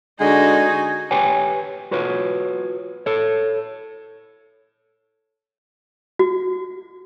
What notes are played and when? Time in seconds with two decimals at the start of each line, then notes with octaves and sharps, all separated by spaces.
0.20 D3 G#3 D#4 F#4 G#5
1.11 G4 B4 C#5 G5 G#5
1.91 F4 F#4 B4 C#5
3.06 A4 C#5
6.19 F#4